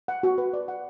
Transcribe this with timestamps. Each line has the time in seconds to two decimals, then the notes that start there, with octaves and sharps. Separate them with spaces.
0.08 F#5
0.23 F#4
0.38 B4
0.53 D5
0.68 F#5